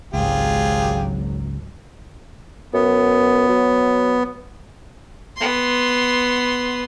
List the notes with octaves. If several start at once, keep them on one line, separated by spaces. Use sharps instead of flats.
G#1 C#2 F#3 F4 G4 G#4
F#2 B3
F#3
B3 C6